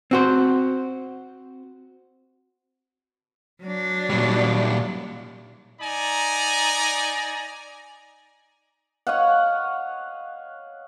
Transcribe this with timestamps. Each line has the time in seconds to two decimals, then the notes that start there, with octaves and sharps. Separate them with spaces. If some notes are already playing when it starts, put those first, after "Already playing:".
0.11 C4 F#4 C5
3.63 F#3 D4
4.10 A#2 G3
5.81 D#4 D5 G#5 A#5
9.07 C#5 D#5 F5 F#5